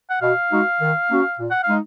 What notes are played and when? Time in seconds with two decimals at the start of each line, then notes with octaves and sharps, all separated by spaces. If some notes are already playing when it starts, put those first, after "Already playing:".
0.10 F#5
0.21 B2 F5
0.51 G#3 D#4 F#4
0.81 D#3
1.10 A#3 C#4 F#4
1.39 A#2
1.51 F#5
1.63 F5
1.68 G#3 D#4